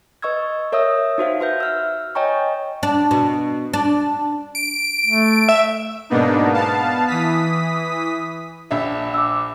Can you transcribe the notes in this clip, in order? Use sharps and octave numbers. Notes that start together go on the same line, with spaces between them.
B4 D#5 C#6 E6 G#6
A#4 C#5 E5 D#6 E6
D#4 F#4 C5 F5
F#4 B4 E5 G6
E6 F6
C#5 D#5 G5 G#5 A#5 C#6
D4
B2
D4
D7
A3
E5
G#2 B2 A#3 B3 D4 D#4
B3 F5 A5
E3 D#6 B6
A#1 D4 E5
D6 E6